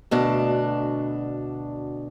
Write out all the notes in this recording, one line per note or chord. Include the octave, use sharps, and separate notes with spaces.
D2 B2 D4